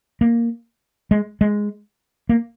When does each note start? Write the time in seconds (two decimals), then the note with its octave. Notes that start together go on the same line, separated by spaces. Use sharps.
0.21 A#3
1.11 G#3
1.41 G#3
2.29 A#3